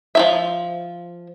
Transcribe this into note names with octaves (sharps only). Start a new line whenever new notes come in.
F3 F#3 E5